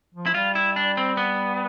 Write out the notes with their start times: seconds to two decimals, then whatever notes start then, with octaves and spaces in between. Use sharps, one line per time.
0.14 F3
0.26 E4
0.34 G3 F4
0.55 E4
0.76 D4
0.97 C4
1.17 B3